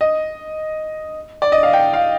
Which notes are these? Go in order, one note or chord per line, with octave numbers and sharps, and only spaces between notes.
D#5
D5
D#5
F5
G5
F5